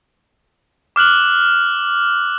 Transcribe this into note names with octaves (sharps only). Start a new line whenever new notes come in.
D6 F6 F#6 F#7